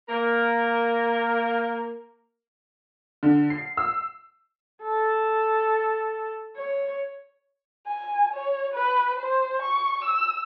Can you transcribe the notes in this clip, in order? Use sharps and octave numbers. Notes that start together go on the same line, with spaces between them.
A#3 A#4
D3
C7
E6
A4
C#5
G#5
C#5
B4
C5
C#6
E6